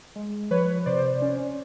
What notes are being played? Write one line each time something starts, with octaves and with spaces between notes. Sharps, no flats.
G#3
F3 B4 C#5
C3 C5 D5
C#4